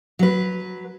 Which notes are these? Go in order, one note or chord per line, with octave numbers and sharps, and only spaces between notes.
F#3 B4